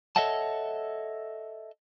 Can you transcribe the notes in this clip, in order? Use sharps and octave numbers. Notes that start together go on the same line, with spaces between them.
A4 C#5 D#5 E5 F#5 A5